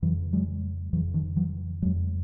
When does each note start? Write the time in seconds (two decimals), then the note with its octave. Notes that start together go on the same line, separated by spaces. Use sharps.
0.02 F2 C#3 E3 F#3
0.33 F#3 G#3
0.93 F2 C#3 E3 F#3
1.14 D#3 F3
1.36 E3 F#3
1.82 F2 C#3 F#3 G#3